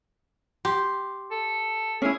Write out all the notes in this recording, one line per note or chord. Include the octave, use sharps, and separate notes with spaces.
G4 C6
A4
C#4 E4 G#4